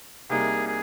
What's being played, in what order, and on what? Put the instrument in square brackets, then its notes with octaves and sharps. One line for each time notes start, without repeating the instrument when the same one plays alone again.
[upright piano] C2 C3 G3 A#3 D#4 [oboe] G#4
[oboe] G#4